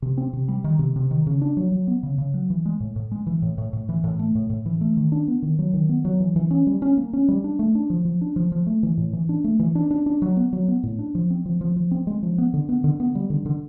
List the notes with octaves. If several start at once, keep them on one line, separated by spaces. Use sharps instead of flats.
C3
C4
C3
G3
D#3
C3
C3
D#3
C#3
D4
F#3
F#3
B3
C#3
C#3
F#3
E3
G#3
A2
A2
G#3
E3
A2
A2
A2
E3
A2
A3
A2
A2
E3
A3
D#3
D4
B3
D#3
F#3
D#3
B3
F#3
E3
E3
C#4
G3
C#4
A#3
C#4
G3
D4
A3
D4
F3
F3
D4
F3
F3
A3
E3
A2
E3
D4
A3
E3
D4
D4
D4
F#3
B3
F#3
B3
A2
D4
F3
C4
F3
F3
F3
C4
G#3
F3
B3
D3
B3
D3
B3
G3
D3
D3